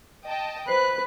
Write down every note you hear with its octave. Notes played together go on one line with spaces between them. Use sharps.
D#5 G5 A5
B4 C5 F#6